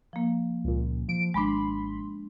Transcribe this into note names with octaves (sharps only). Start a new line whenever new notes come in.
F3 A#3
C#2 A#2
F3 D7
G#1 G#3 D4 B5 C6